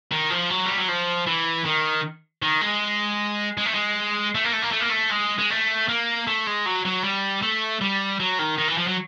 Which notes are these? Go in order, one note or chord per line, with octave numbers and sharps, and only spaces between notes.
D#3
F3
F#3
G3
F#3
F3
E3
D#3
D#3
G#3
G#3
A3
G#3
A3
A#3
A3
A#3
A3
A#3
A3
G#3
G#3
A3
A#3
A3
G#3
F#3
F#3
G3
A3
G3
F#3
D#3
D#3
E3
F3
F#3